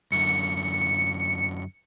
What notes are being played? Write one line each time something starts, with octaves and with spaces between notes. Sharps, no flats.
F#2 D3 C#7